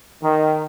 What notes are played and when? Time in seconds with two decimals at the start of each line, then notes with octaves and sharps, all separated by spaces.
0.23 D#3